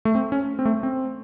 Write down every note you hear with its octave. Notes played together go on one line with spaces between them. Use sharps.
A3
C4
C#4
C4
A3
C4